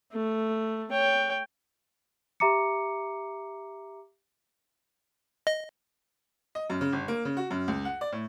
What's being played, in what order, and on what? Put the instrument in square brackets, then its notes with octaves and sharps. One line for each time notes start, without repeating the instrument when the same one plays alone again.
[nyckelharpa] A3
C#5 G5
[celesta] G4 E5 A#5 D6 C#7
[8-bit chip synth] D#5
[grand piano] D#5
F#2
C#3
G1
A#3
C#3
F#4
F#2
C#2
F#5
D5
A2